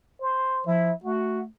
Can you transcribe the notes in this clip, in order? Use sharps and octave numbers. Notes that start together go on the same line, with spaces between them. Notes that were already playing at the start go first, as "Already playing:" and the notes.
C5
F3 E4
A3 F#4